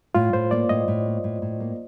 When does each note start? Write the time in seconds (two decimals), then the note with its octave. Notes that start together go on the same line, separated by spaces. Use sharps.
0.15 A2 F4
0.33 A2 C5
0.51 A#3 D5
0.69 A2 D#5
0.88 A2
1.06 A#3
1.24 A2
1.42 A2
1.60 A#3